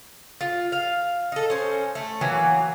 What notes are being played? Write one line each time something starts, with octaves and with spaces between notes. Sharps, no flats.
F4
F5
D#4 A4
C#4 C5
A3
E3 F#3 A#3 B3